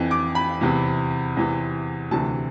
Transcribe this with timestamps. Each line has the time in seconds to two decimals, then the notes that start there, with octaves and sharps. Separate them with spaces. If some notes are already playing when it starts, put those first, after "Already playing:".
Already playing: F2 E3
0.11 D6
0.35 B5
0.61 E2 C3 E3
1.37 E2 C3 E3
2.11 D2 C3 E3 A5